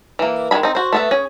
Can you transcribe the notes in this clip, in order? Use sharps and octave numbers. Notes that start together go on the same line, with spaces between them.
E3 A#3
D#3 G#3 F#4 G#4 B5
C4 D#4
F#4 C5
A3 B3 E5
C#4 G#4